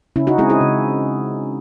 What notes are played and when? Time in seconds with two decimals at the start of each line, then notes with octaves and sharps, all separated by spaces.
0.16 C#3 C#4 E4
0.27 D#4 F#4
0.38 G#3 C4 E4 G#4
0.50 E4 G#4
0.61 C#3